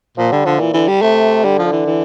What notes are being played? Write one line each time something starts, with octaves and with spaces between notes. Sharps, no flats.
A#2 F3
D3 G3
D3 F3
A#2 E3
D3 E3
G3
C3 A3
D3 G3
F3
D3
E3
E3